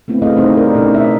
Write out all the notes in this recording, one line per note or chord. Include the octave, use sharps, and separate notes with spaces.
A3 B3 C4 E4
A3 C4 E4 G#4 D#5 F5
C#3 G3 C4 D#4 E4 C5
D#4 A#4 D5
B2 A3 C#4 D#4 E4 A4
E4 F#4 A4 C5 D#5 E5